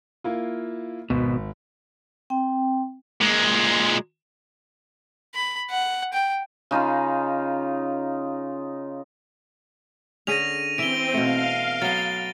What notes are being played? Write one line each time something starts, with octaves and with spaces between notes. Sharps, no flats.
A#3 E4 F4
G#1 B2
C4 G5
A#2 G#3
B5
F#5
G5
C#3 D#4 F4 A#5
D3 C#4 G#4 A#6 D#7 F7
E3 C4 E5 D7 F7 G7
B2 A3 F5
F#3 B3 A6 G7